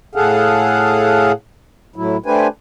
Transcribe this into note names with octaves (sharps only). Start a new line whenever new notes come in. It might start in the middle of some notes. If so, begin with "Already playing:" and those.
A2 G#4 A4 F5 F#5
A2 F#3 E4
A3 D4 G4 B4 C5 G#5